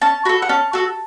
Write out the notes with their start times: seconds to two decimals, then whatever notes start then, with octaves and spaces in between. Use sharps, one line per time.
0.01 C#4 A5
0.25 F#4 A4 B5
0.42 F#5
0.49 C#4 A5
0.73 F#4 A4